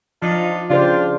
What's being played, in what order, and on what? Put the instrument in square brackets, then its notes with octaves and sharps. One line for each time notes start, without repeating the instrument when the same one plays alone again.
[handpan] F3 [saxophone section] D4 D#4 F4
[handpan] C#3 G4 C5 [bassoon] D4 [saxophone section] F4